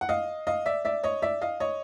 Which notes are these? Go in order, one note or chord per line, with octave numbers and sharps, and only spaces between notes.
F#5
D#5 F5
D#5 F5
D5 E5
D5 E5
C#5 D#5
D5 E5
D#5 F5
C#5 D#5